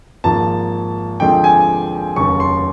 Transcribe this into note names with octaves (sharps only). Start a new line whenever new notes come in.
G#1 G#2 F3 A#3 A5
D#2 D3 F3 G#3 C4 G5
G#5
F1 D#2 C#3 F#3 C#6
C6